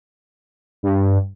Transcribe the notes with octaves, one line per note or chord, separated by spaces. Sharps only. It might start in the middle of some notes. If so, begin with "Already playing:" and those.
G2